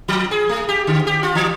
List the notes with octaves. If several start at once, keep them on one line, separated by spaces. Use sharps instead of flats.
F3
G#4
A3
G4
D3
G4
F4
E3